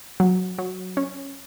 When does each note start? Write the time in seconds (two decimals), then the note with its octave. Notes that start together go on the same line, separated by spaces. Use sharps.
0.20 F#3
0.58 F#3
0.97 C#4